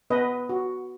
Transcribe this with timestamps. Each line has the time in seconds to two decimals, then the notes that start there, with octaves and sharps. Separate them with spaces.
0.10 B3 B4 D#5
0.49 F#4